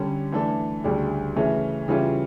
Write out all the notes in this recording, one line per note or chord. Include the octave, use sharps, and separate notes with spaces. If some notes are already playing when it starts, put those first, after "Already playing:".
Already playing: D3 G3 C#4
E3 A3 D4 A4
D2 C#3 G3 D4
C#3 E3 A3 C#4
C#3 E3 G3 C#4 F4